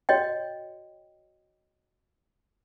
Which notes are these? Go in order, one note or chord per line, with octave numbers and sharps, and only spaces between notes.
F#4 C#5 D#5 G5